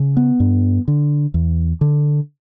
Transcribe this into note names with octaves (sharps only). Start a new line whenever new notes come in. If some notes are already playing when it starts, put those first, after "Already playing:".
Already playing: C#3
B3
G2
D3
E2
D3